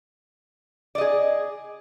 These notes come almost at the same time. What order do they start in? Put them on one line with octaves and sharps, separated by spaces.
D5 D#5 G#4